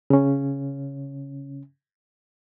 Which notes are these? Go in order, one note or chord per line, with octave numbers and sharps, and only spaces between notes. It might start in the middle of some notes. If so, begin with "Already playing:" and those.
C#3 C#4